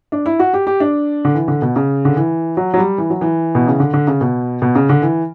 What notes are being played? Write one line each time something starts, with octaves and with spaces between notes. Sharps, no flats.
D4
E4
F#4
G4
G4
D4
D3
E3
D3
B2
C#3
D3
E3
F#3
F#3
G3
E3
F#3
E3
B2
C#3
D3
D3
C#3
B2
B2
C#3
D3
E3